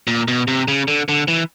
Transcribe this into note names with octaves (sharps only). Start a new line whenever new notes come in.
A#2
B2
C3
C#3
D3
D3
E3